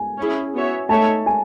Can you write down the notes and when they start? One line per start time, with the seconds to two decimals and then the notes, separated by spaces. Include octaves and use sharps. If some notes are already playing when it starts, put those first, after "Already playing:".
Already playing: G#5
0.18 C#4 E4 G#4
0.54 B3 F#4 C#5 E5
0.89 A3 D#4 A4 C#5 E5 A5
1.26 G#5